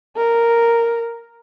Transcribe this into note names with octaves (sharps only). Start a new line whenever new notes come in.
A#4